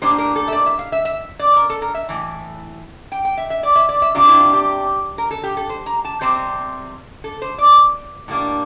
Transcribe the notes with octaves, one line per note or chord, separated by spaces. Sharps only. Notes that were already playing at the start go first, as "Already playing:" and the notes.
A2 G3 A#3 D4 C5
A#4
A4
E5
D5
E5
F5
E5
E5
D5
A#4
A4
A#4
E5
A2 E3
G5
G5
E5
E5
D5
E5
D5
E5
C3 G3 D4 F4
E4
F4
G4
A#4
A4
G4
A4
C5
A#5
A5
C3 G3 C4 C5
A4
C5
D5
A2 G3 A#3 D4